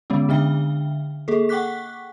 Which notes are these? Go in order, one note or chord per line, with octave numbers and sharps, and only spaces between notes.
D3 G#3 B3 C#4
D3 D4 E5 G5
A#3 G#4 A4
F#5 G5 C#6 D6 F#6 B6